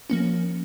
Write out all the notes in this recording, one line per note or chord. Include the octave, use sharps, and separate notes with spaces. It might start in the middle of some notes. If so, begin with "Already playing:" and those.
F3 A#3 C#4